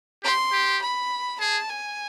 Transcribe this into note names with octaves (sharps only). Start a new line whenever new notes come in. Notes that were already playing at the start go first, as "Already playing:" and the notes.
G4 C6
G4
B5
G#4 A5
G#5